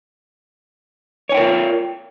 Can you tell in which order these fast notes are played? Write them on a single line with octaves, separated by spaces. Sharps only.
C#5 G#5 G5 A#4 F4